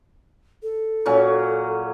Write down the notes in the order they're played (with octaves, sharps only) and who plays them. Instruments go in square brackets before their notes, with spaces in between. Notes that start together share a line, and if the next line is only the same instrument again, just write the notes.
[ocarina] A4
[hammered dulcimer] A#2 F#3 C#4